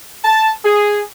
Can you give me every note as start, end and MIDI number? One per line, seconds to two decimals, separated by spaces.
0.24 0.50 81
0.65 1.01 68